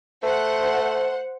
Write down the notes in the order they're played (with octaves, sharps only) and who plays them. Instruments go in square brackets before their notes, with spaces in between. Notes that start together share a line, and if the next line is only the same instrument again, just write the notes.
[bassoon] A3 [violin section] C5 F#5